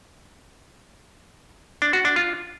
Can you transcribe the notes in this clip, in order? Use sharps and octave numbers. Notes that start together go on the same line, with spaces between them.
D4
F#4
D4
F4